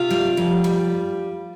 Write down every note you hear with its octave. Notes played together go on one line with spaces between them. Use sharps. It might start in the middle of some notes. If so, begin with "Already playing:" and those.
Already playing: C3 F4
G3
F2
G3